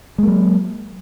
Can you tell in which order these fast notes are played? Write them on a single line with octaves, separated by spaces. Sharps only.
G#3 A#3 F#3